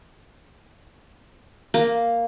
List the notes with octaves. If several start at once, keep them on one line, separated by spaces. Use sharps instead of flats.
A#3